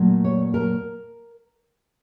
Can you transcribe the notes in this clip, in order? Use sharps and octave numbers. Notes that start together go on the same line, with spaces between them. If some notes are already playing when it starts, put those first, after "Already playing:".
Already playing: A#2 F#3 A3
C#5
A#4